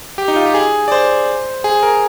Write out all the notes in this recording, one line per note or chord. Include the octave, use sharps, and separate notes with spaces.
G4
D#4
F4
G4
G#4
D5
C5
G#4
A#4